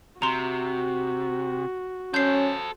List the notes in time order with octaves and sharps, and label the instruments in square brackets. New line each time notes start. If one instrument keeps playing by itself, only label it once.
[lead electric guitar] C3 [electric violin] F#4 [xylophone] A#5 C6
[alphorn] C#4 [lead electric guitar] A4 C5 [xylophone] G6 C7